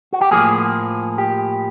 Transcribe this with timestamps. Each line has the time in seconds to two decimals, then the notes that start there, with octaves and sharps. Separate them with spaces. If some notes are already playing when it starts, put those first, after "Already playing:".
0.13 F#4
0.21 G4
0.31 A2 F3 A#3 G#4
1.18 G4